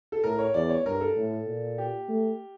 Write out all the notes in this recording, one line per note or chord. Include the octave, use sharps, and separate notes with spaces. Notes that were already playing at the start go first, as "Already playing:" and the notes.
A4
A2 A#4
C#5
E2 D5
C#5
G2 A#4
A4
A2
A#2
G4
A3